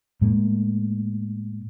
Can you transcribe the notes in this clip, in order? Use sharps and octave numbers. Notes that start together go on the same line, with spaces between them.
A2 G#3 A#3